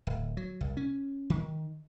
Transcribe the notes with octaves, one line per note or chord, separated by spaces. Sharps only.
D1
F#3
C2
C#4
D#3